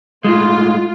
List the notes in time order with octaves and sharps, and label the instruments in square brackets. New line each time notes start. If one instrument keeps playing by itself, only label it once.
[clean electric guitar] A2 G#3 [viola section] F4